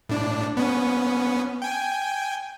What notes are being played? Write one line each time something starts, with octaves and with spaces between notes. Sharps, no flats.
A2 D4
B3 C#4
G5 G#5